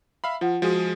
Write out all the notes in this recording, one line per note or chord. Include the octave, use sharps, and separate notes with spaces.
E5 F5 B5
F3 F4 F#5
F3 G#3 F#4 G#4